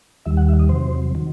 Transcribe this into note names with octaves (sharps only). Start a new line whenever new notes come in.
D#2 D#3 G3 E5
F#5
E5
D#5
E2 C3 F#3 C5
D#3 F#3